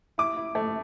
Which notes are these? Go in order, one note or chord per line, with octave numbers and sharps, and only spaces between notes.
E4 D6
E4
A3